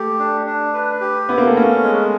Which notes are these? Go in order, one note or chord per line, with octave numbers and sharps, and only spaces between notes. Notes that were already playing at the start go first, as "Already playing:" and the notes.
Already playing: A3 G4
D4
D4
B4
G4
B3 E4
A#3
A3
A#3 C#4
G#3